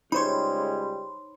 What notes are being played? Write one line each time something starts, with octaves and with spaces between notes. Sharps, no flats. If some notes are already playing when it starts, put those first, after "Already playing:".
C#2 G3 G#3 D#4 C5 C#5 B5 C6